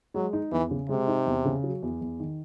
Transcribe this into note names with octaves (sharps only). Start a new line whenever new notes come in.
F#3 G#3
D#4
E2 E3
C#3
C3 G#3
D#4
E2
C#3
F#3
E2
E2
D#3